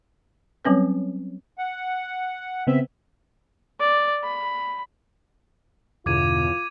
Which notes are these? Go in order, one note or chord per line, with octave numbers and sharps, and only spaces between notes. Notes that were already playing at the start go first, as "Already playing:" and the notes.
F#3 G3 C4 C#4 B4
F#5
C#3 B3 C4 E5
D5
B5
E2 G2 B2 D3 F4 D6 G#6 D#7